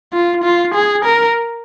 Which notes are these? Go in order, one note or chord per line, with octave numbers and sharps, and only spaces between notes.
F4
F4
G#4
A#4